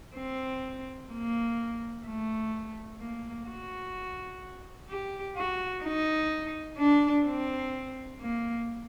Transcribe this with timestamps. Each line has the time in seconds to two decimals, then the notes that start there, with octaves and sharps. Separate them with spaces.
0.16 C4
1.12 A#3
2.06 A3
3.01 A#3
3.47 F#4
4.90 G4
5.36 F#4
5.83 D#4
6.78 D4
7.26 C4
8.20 A#3